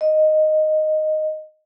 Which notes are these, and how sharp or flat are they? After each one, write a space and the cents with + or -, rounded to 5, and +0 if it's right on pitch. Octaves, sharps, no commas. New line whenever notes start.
D#5 -5